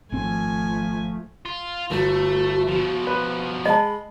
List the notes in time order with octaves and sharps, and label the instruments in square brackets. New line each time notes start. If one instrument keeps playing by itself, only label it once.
[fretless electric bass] G#1 C4 [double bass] F3 A3 [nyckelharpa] G#5
[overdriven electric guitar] F4
[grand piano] G1 [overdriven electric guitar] A3 [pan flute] F#4
[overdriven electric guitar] B2 F3
[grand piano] B4
[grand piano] G#3 [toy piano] D#5 A5 [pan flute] B5